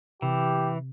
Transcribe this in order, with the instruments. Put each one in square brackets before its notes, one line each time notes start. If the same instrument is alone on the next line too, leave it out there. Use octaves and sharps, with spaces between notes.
[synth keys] C3 [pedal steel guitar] E3 [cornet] G4